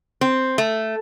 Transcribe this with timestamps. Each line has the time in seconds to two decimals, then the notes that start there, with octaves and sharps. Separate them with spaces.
0.21 C4
0.58 A3